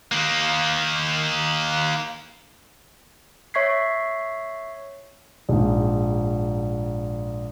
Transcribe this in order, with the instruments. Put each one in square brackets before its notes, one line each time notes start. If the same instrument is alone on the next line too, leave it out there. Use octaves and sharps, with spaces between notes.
[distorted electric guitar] D#3 A#3
[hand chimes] C#5 E5 C#6 G#6 B6 C7
[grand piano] A#1 G#2